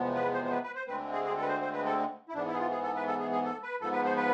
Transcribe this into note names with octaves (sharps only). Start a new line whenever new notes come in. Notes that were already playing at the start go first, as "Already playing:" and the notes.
Already playing: E2 C3 F3 G#3 B3
B4
C5
C5
B4
B4
C5
D2 D3 G#3 C4 B4
G#4
G#4
A4
B4
C5
C5
B4
A4
E4
G#2 E3 B3 D4
E4
G#4
F4
G#4
A4
B4
A4
G#4
G#4
A4
B4
G#2 F3 B3 A4
B4
C5
B4